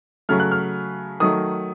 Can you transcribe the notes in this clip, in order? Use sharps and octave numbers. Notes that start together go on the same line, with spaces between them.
C#3 F#3 A3 F6
F#6
F6
D#3 F#3 A3 D#6